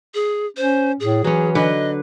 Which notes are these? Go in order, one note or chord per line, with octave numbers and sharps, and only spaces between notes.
G#4
C#4 C5
A2 G#4
E3 F#3 C#4
D3 B4 D#5